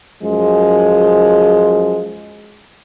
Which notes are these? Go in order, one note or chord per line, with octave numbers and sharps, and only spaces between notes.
F#2 F3 G#3